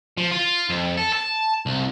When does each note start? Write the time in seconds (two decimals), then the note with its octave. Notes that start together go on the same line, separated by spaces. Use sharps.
0.17 F3
0.31 F4
0.69 F2
0.97 A4
1.13 A5
1.66 C2